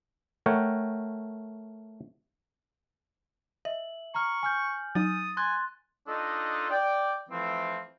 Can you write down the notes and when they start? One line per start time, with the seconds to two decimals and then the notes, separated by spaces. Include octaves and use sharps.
0.46 A3 A#4 C#5 F#5 G5
3.65 D#5 E5 F#7
4.14 A#5 C#6 F6
4.43 G#5 F6 G6
4.95 F#3 D#4 D#6 A6
5.37 G#5 C6 F#6 A6
6.07 D4 D#4 F4 A4 D#5
6.70 D5 G5
7.30 E3 F3 A3 C4